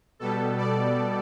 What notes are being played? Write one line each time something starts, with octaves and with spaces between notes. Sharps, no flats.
B2 G3 B3 A4
D5